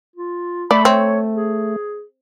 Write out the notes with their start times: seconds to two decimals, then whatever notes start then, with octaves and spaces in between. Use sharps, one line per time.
0.16 F4
0.71 A3 D5 B5
0.85 C4 C#5
1.34 G#4